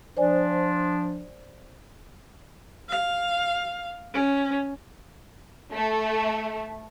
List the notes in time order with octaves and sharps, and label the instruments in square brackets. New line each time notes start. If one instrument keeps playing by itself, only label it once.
[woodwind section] F3 D4 [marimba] C5 D5 G#5
[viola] F5
C#4
[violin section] A3